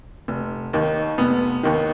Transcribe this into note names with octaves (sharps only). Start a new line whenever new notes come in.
F1
D#2 D#3
F1 B3
D#2 D#3